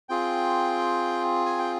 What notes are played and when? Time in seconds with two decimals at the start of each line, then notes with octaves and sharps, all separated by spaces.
0.09 C4 F4 G#4 G5
1.46 G#5
1.59 G5